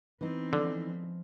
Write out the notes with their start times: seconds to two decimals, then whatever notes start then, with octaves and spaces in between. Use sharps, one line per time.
0.21 E3 B3 C4 D#4
0.53 D3 F3 G#3